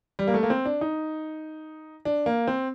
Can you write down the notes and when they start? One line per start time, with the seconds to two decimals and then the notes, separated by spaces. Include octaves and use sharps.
0.19 G3
0.27 A#3
0.34 A3
0.43 A#3
0.50 C4
0.65 D4
0.81 D#4
2.05 D4
2.26 A#3
2.47 C4